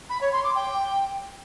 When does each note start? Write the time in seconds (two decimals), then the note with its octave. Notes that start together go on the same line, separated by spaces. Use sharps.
0.09 B5
0.21 C#5
0.32 C6
0.43 D6
0.55 G5